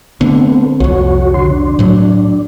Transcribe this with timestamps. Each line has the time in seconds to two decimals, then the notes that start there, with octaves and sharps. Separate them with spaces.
0.21 D3 A3 B3 C4
0.80 C2 F2 F#4 C#5
1.34 D3 F#4 C6
1.51 D4
1.79 A2 F#3